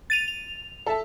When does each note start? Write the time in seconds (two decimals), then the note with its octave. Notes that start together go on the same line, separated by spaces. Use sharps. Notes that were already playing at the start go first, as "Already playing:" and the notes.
0.10 A6 D#7 F7
0.28 F7
0.86 A4 E5 A5